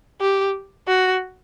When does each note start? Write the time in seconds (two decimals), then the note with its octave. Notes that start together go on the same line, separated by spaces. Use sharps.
0.21 G4
0.88 F#4